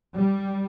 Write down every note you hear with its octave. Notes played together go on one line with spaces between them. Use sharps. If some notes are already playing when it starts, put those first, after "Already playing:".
G3